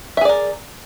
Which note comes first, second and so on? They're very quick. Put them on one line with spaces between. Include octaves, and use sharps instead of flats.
E5 G#4 D5 A#4